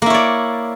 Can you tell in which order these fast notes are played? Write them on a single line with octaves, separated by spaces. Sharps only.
A#3 E4 C#5 D5